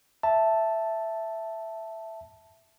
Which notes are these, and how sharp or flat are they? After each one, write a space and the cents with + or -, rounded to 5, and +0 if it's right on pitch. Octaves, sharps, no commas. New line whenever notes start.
E5 +0 A5 +0